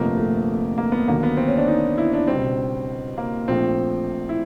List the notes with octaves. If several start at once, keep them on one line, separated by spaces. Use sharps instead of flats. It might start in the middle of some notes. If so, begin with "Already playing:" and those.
Already playing: G1 F2 C3 F3 A3 A#3
A3
A#3
B3
D#2 D3 F#3 A#3
B3
C4
C#4
D4
D#4
E4
D4
C#2 B2 G3 C4
A#3
A#1 A#2 F3 A3 C4
E4